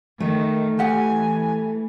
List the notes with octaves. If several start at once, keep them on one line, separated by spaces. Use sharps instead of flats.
D#3 A3
E3 G4 F#5 G#5